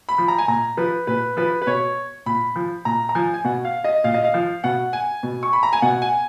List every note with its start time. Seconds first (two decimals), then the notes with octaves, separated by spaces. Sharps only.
0.09 B5
0.18 F3
0.28 A#5
0.38 G#5
0.48 A#2 A#5
0.77 F3 B4
1.07 A#2 B4
1.37 F3 B4
1.62 B4
1.67 B2 C#5
2.26 A#2 B5
2.56 F3
2.85 A#2 A#5
3.09 A#5
3.15 F3 G#5
3.34 G#5
3.44 B2 F#5
3.65 F5
3.84 D#5
4.04 A#2 F5
4.14 D#5
4.24 F5
4.34 F3
4.64 B2 F#5
4.93 G#5
5.23 B2
5.43 C#6
5.53 B5
5.63 A#5
5.73 G#5
5.82 B2 F#5
6.02 G#5